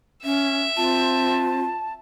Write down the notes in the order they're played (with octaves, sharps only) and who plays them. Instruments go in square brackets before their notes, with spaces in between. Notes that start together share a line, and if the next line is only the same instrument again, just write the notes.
[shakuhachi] C#4 [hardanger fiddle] E5
[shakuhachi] C4 [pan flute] F4 [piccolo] A5